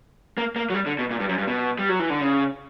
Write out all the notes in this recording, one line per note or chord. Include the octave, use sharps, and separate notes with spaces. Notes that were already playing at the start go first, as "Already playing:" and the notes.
A#3
A#3
F#3
G3
D3
B2
A#2
G2
F#2
G2
B2
G3
F#3
E3
D3
C#3